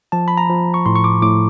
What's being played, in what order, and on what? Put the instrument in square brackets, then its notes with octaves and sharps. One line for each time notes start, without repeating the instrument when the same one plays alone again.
[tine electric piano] F3 A5
B5
A#5
F3
C#6
A2 C6
C#6
D6
A2 D6